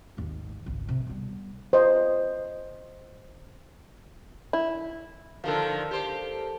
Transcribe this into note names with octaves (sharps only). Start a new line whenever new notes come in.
G#1 D#2
G#1 C#2
C3
G3 B3
C5 D#5
E4
D3 D#3 F3 A4 A#4 F5
G4 C5